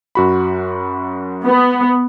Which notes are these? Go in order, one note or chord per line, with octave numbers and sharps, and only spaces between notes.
F#2 F#4 B5
B3